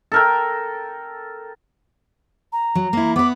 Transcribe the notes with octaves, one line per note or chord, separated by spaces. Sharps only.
A4 A#4 G5
A#5
F#3
A#3 E4
B3 B4 D6